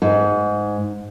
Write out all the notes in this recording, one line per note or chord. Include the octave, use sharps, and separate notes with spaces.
G#2